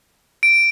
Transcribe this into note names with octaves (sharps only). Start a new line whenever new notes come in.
D7